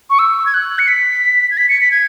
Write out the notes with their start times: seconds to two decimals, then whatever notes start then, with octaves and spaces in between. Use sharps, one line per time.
0.10 C#6
0.19 E6
0.46 G#6
0.54 F#6
0.79 C#7
0.88 B6
1.51 G#6
1.57 B6
1.69 C#7
1.81 B6
1.91 G#6